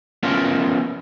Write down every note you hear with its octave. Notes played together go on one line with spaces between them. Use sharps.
B3 C#4 F4 A#4 E5 A5